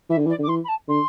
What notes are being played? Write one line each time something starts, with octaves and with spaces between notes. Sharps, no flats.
E3 E5
D3
E3
D5
D3 D6
E3 C6
B5
A5
D3 C6